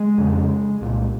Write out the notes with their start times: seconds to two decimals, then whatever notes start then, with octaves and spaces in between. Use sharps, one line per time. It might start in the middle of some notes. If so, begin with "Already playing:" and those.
Already playing: G#3
0.18 F2 C#3
0.81 C2 A#2